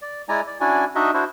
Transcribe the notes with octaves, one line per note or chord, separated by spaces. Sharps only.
D5
G#3 E4 D5 G#5 A#5
D5
C#4 D4 E4 F#4 D5 G#5
D4 D#4 F#4 D#5 E5
D4 E4 F#4 C5